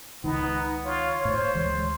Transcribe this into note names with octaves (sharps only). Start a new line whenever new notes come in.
C#2 D#3 B3 D#4
F4 C#5
A2 C5
D2 E3 G#3